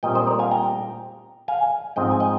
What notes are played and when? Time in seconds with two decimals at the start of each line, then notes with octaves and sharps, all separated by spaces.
0.03 A#2 G3 C4 D#5 G5
0.15 C5 D#5
0.27 A#4 D5
0.39 F5 G#5
0.51 G5 A#5
1.48 F5 G#5
1.96 G#2 F3 C4 D#5 G5
2.11 G#5
2.20 D#5 G5